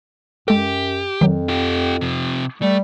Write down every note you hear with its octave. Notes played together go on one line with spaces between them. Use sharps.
F#2 G#3 G4 A4
F2 D#3 F#3
F4 G4
C3 F3
G3 A3